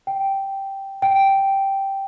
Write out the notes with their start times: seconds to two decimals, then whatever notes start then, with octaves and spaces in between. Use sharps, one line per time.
0.07 G5
1.02 G5